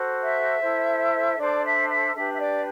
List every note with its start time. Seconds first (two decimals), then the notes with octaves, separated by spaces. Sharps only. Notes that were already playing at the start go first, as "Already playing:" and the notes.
Already playing: F#4 A4 C5
0.22 E5
0.60 E4 A4 C5
1.36 D4 A4 C5 D5
1.63 E5
1.87 E5
2.13 D4 G4 B4 E5
2.32 E5
2.39 D5